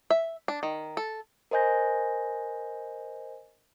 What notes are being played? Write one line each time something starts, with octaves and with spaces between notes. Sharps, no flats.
E5
D4
D#3
A4
A#4 C5 D#5 G#5 G6 A#6